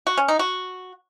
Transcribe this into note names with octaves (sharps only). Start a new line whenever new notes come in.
F#4
C#4
D#4
F#4